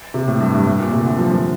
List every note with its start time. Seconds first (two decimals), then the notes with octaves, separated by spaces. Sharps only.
0.14 C3
0.28 A2
0.40 G2
0.54 G2
0.66 A2
0.79 A#2
0.92 C3
1.05 D3
1.18 F3
1.32 F3